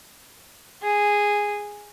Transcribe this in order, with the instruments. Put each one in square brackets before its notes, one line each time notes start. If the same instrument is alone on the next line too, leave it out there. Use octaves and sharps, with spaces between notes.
[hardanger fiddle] G#4